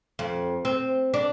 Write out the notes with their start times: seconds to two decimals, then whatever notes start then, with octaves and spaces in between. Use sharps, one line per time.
0.19 F2
0.65 C4
1.14 D4